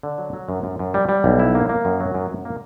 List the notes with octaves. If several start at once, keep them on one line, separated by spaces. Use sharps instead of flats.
D3
F#3
F#3
F#2
F#2
F#2
G3
G3
B1
E4
A#3
A#3
F#2
F#3
F#2
F#2
A#3